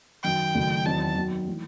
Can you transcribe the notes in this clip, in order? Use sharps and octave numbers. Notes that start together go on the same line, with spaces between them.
F#2 D#3 F#3 G5
F#1 F#2 D#3 F#3 A3
E2 D#3 F#3 C4 D#4 A5
F#2 D#3 F#3 B3 F#4
E3 A3 D#4